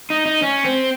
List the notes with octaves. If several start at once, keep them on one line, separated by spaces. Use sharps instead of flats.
D#4
D#4
C#4
C4